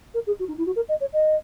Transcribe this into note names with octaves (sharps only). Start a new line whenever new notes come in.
A#4
G#4
F#4
D#4
E4
F#4
A#4
D#5
C#5
D#5